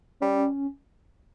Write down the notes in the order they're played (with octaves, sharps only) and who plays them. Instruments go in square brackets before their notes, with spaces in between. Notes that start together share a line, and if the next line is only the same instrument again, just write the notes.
[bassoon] G3 [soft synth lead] C#4